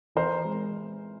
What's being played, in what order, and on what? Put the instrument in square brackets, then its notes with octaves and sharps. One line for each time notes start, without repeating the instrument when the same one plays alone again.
[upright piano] E3 [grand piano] A#4 C5
[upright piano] G#3